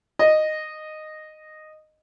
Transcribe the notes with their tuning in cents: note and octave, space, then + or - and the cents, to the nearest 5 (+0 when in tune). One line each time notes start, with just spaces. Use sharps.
D#5 -10